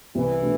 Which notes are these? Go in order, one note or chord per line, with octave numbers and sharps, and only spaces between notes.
C2 E3
B2 A3 D4 A4